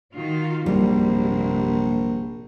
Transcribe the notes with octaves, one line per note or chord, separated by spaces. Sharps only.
D#3 F4 F#4
A#1 F#2 C3 G3 A#3